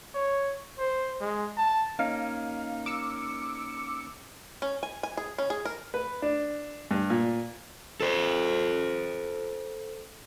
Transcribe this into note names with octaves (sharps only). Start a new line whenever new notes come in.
C#5
C5
G#3
A5
A#3 C#4 D#4 F5
D6 E6 C#7
C#4
G#5
G#5
G#4
C#4
G#4
A#4
B4
D4
G2
A#2
A4 C5